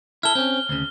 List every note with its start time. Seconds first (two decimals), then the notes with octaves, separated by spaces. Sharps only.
0.23 E4 A4 F6 G7
0.35 C4 C#4
0.69 D2 C#3